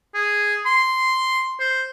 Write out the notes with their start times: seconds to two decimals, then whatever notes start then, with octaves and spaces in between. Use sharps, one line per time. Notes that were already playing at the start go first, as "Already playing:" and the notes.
0.15 G#4
0.66 C6
1.60 C5